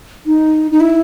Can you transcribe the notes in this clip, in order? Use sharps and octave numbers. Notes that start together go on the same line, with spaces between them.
D#4
D#4
E4